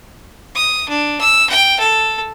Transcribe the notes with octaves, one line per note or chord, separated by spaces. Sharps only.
D#6
D4
E6
G5
A4